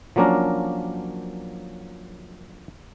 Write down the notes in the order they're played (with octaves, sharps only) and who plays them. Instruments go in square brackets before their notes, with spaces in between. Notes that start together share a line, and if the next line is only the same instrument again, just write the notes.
[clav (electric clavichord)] F3 F#3 A#3 C#4 D4 A#4